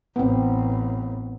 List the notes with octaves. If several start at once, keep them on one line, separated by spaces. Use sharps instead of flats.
A1 B3 C4